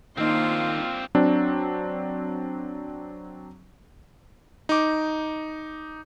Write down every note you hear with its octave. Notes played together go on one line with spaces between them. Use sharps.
D#3 A#3 C4 D4 D#4 F4 C5
F#3 C4 D4
D#4 D6